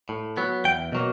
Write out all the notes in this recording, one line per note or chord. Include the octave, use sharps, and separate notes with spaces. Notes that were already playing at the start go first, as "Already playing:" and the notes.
A2
F#3 B3
E2 G5
B2 F#3 A#3